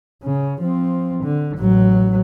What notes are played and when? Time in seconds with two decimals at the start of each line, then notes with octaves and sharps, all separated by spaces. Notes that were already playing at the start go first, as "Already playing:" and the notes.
0.24 C#3
0.61 F3 C4
1.24 D3
1.58 A1 F#3